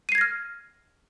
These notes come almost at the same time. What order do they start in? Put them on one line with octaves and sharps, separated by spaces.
D#7 C7 G#6 A#6 F6